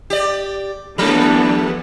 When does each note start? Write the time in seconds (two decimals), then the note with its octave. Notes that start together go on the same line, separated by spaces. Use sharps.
0.10 G4 D5
0.98 D3 E3 F3 G3 A3 B3 D4